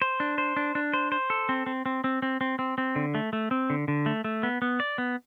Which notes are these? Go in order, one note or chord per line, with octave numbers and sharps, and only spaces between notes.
C5
D4
C5
D4
D4
C5
C5
A4
C4
C4
C4
C4
C4
C4
C4
C4
D3
A3
A3
C4
D3
D3
A3
A3
B3
B3
D5
B3